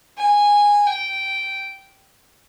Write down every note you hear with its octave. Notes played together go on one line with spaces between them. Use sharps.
G#5
G5